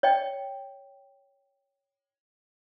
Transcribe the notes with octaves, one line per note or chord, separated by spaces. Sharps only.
C#5 D#5 G5